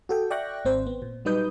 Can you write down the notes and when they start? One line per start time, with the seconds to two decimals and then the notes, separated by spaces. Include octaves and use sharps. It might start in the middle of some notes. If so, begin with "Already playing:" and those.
0.09 F#4 A4 G5
0.31 D5 E5 G5 C#6 F#6 A#6
0.65 G#1 C4 C5
0.87 B3
1.02 A#2
1.25 F#3 G3 D#4 B4 D#6 G6